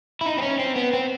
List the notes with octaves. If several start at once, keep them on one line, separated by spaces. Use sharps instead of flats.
E4
D#4
C4
C#4
C4
B3
C4